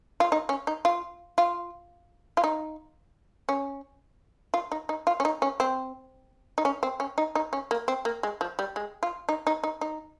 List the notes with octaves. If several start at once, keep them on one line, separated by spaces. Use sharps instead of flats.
F4
D#4
C#4
D#4
F4
F4
F4
D#4
C#4
F4
D#4
D#4
F4
C#4
D#4
C#4
C4
D#4
C#4
C4
C#4
D#4
D#4
C#4
A#3
C4
A#3
G#3
F3
G3
G#3
F4
D#4
D#4
D#4
D#4